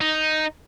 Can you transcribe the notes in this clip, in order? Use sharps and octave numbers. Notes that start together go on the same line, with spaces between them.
D#4